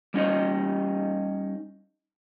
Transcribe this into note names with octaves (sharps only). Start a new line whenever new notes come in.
G3 C#4 D#4 D#5